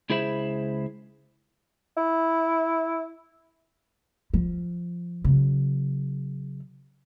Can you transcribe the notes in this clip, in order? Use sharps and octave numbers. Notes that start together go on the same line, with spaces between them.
C#2 E4 G#4 C5 E5 B5
E4
F3
C#3 F#3